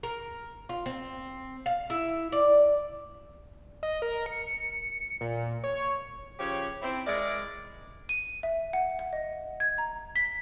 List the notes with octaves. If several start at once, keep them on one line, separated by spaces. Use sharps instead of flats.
A#4
F4
C4
F5
E4
D5
D#5
A#4
C#7
A#2
C#5
C#3 F3 G4 C#5
C4 E4
G#3 E4 A#4 D5
D#7
E5
F#5
F#5
D#5
G#6
A#5
B6